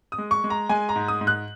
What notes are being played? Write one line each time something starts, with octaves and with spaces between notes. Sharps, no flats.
D#6
G#3
C#6
G#3
A#5
G#3 G#5
A#5
G#2
D#6
G#2
F#6